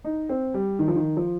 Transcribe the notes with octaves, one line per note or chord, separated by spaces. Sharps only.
D#4
C4
G3
D#3
F3
D#3
F3